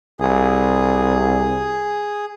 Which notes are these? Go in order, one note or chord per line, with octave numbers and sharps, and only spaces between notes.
C2 G#4